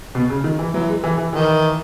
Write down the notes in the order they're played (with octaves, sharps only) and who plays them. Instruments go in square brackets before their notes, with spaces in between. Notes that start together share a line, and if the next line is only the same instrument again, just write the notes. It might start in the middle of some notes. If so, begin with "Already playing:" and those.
[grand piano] B2
C#3
D#3
E3
[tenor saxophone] E3 [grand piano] F#3
[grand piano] G#3
E3
E3
[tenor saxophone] D#3 [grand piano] E3